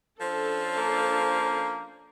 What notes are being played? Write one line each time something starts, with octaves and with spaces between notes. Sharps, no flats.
F3 C#4 D4 A4 C5
A#3